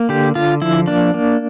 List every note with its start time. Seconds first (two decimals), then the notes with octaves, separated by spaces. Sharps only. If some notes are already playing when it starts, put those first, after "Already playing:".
Already playing: A#3
0.09 D3 G4
0.35 D3 F4
0.61 F3 E4
0.87 A#3 D4
1.14 A#3